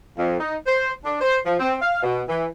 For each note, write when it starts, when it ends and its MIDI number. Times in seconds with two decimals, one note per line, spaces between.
0.17 0.39 41
0.40 0.56 63
0.66 0.92 72
1.05 1.19 62
1.21 1.38 72
1.46 1.56 53
1.60 1.75 60
1.82 2.02 77
2.03 2.21 47
2.28 2.46 52